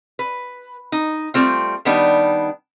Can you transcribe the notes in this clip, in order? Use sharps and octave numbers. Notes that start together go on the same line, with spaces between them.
B4
D#4
G3 A3 C4 F4
D#3 G3 B3 D4 D#4